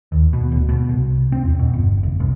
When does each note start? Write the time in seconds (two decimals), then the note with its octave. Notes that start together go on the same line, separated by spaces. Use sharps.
0.12 D#2
0.33 B2
0.52 D1
0.69 B2
0.89 C2
1.32 C4
1.45 E2
1.59 B2
1.74 G1
2.03 F1
2.20 C2